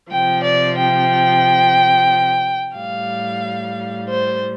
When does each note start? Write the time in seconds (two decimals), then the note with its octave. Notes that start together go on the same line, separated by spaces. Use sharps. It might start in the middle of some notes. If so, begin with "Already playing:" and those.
0.12 C3 F3 G5
0.44 D5
0.78 G5
2.76 A2 G3 F5
4.09 C5